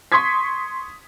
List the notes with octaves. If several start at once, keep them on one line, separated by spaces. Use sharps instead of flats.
C6 C#6 D#6 G#6 B6